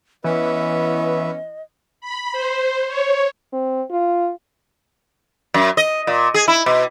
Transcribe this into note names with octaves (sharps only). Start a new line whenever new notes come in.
E3 B3 C#4 B4 D#5 E5
B5
C5
C#5
C4
F4
F#2
D#5
A#2
G#4
E4
B2